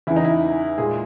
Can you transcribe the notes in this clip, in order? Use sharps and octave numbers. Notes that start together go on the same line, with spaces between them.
E2 C#3 E3 E4
D#4
E4
A#2 G#3 G#4